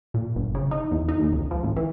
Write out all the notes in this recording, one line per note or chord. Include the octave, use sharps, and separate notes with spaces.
A#2
G1
C#3
D#4
E2
D#4
D#2
C#2
F3
A1
E3